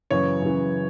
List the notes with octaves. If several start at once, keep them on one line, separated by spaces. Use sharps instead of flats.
F#2 C#3 E3 C#5
F#2 C#3 E3